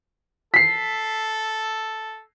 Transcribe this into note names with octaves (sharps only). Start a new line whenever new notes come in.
A4 B6 C7